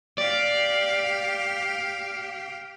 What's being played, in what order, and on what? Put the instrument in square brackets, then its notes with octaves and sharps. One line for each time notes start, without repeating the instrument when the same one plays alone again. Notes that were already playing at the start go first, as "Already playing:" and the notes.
[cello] G4 F5 [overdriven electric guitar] D5